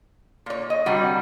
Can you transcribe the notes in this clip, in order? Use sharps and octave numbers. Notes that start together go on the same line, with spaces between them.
A#2 C#5
D#5
G2 C3 G3 F#4